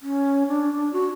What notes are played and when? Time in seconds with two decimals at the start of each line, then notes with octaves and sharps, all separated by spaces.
0.02 C#4
0.48 D4
0.93 F#4